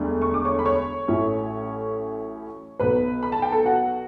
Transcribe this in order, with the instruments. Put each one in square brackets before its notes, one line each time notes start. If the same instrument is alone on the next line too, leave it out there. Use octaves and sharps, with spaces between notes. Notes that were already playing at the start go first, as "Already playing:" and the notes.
Already playing: [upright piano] E1 D2 G3 D4
C#6
D6
C#5 C#6
B5
C#5 C#6
A1 A2 F#3 C#4 E4
B1 B2 F#3 B4 B5
B5
A5
G5
A4 A5
F#4 F#5